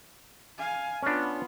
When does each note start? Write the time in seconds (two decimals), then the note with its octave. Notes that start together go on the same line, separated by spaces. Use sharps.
0.58 F5 G#5
1.03 B3 C#4 D4 F4